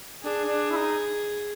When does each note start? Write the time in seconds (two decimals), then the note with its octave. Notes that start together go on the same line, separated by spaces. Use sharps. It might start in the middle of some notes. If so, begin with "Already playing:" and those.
0.23 D4 G#4
0.47 D4
0.72 E4
0.76 D#4